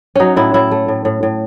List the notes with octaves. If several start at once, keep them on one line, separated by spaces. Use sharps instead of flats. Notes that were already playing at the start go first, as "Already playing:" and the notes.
F#3 C#4 D#4
A2 E4
A2 E4
A3
A2
A2
A2